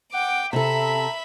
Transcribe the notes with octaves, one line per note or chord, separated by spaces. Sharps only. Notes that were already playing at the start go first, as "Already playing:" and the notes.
F#5 G5 D6
C3 A4 E5 A#5 B5